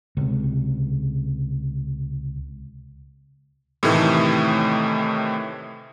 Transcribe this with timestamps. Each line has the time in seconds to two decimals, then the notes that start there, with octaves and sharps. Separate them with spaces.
0.17 C#2 C3
3.83 A2 C3 D#3 E3 A3